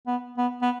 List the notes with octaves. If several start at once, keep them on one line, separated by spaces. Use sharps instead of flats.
B3
B3
B3